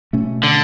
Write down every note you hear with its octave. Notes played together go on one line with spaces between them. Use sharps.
B2 A3 C#4
D3